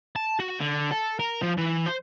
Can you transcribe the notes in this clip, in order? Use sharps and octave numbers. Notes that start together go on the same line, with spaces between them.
A5
F#4
D3
A4
A#4
F3
E3
C5